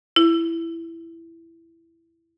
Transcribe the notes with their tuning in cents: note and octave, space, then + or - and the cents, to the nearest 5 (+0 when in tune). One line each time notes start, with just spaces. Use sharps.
E4 +10